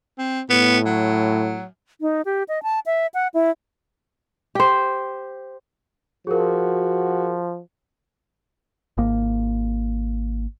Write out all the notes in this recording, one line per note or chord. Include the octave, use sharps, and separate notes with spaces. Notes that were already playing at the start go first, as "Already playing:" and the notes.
C4
A2 B3
F#3
D#4
G4
D#5
A5
E5
F#5
E4
G4 C5
F3 F#4 G#4 A#4
G#1 A#3